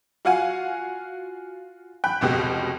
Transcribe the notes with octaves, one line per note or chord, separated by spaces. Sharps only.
F4 F#4 F5 F#5 G#5
G5 B5 F#6
F1 C#2 B2 G4